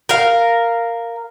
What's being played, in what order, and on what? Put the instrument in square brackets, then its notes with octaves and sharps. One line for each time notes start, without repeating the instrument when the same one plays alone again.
[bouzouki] A#4 F5